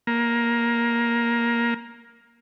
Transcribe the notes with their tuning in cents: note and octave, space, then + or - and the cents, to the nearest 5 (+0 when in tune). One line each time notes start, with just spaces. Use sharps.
A#3 +10